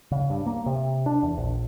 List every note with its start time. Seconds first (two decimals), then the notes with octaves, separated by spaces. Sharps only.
0.11 C#3
0.30 G2
0.46 A#3
0.66 C3
1.06 D4
1.23 E2
1.38 A#1